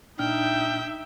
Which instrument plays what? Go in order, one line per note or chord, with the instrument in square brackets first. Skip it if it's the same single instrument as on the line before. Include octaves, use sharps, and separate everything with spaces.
[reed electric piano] A#2 D4 F6 [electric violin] D#4 E5 [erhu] G5